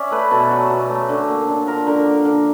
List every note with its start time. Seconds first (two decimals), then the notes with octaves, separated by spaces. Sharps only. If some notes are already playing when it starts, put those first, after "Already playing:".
Already playing: C#4 D5 E5
0.11 A3 B4
0.31 B2 A4
0.51 F#3
0.70 B2
0.90 A3
1.09 D3
1.29 A#3
1.48 D3
1.67 F3 A#4
1.87 D3 A#4
2.05 A#3
2.25 D3